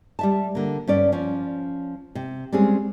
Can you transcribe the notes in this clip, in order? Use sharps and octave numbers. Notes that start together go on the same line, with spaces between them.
G3 E5 A5
D3 A#3
G2 C#4 D5
F3 C#4
C3
G3 G#3 C4 C#4 G#4